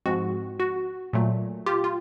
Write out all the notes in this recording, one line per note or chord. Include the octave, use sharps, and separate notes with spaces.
G#2 F3 G#3 C4 F#4
F#4
A#2 F#3 A3
F4 G4
F4